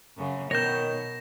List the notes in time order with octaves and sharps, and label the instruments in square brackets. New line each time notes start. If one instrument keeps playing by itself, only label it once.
[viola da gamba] F#2 C#3
[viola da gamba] B2 [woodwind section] D#3 [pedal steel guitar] C#5 G6 [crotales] A#6 E7